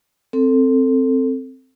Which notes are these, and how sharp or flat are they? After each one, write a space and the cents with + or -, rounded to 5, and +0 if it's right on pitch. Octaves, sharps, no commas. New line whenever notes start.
C4 +0 A4 +15